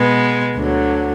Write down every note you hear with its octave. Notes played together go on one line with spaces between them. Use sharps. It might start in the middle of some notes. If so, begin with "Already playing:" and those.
Already playing: B2 G#3 B3
D2 D3 F#3